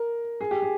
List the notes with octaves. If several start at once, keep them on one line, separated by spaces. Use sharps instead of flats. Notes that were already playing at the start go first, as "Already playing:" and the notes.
Already playing: A#4
G#4
G4
G#4